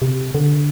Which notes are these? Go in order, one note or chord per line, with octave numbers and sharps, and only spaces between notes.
C3
D3